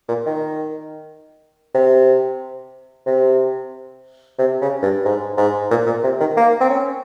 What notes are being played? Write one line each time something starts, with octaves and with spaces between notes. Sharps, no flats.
A#2
D#3
C3
C3
C3
C#3
G2
G#2
G#2
A#2
A#2
C3
D#3
A#3
C4
C#4